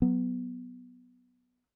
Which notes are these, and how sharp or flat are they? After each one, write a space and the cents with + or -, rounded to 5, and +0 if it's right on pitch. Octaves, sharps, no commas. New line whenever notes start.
F#3 +0 B3 +0